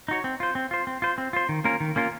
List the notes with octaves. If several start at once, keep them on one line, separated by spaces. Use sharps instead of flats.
D#4 F#4 C#5
C4
F4 C5
C4
F4 C5
C4
F4 C5
C4
F4 C5
D#3
A#3 C#4 F4 A#4
D#3
A#3 C#4 F4 A#4